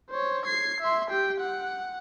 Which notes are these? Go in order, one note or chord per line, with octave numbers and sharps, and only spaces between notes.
C5 C#5
G#6 C7
E5 C6
G4 G5
F#5